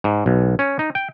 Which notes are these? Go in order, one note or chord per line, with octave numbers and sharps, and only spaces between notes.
G#2
B1
C#4
D#4
G5